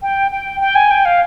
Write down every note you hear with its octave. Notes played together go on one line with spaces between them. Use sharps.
G5
G5
G5
G#5
G5
F5